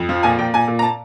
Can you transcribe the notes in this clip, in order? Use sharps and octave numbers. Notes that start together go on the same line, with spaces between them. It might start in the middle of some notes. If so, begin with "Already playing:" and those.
Already playing: F2
F3
A#2 G#5
A#2 G5
A#2 G#5
A#2
A#5
A5